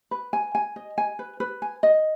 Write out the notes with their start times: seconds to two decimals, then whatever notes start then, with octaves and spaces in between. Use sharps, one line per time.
0.11 B4
0.33 G#5
0.55 G#5
0.76 D#5
0.98 G#5
1.19 B4
1.40 B4
1.62 G#5
1.83 D#5